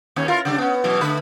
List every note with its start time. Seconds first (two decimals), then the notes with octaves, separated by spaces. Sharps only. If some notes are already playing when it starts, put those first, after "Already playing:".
0.16 D#2 C#4
0.28 E4 F4 A#4
0.45 C#3 G3 D4
0.58 B3 C#4
0.84 B2 E3 F#3
1.01 D3 A3 B4